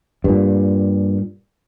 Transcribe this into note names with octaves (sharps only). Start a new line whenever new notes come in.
G2 A#2